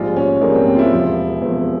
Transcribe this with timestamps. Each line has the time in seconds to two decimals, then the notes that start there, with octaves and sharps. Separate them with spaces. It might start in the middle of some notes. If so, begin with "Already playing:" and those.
Already playing: A#1 G#2 G3 F4
0.16 C#4
0.41 A#1 G#2 G3 A#3
0.54 C4
0.66 C4
0.75 F4
0.79 E4
0.91 E1 E2 C3 F3
1.41 E1 E2 C3 F3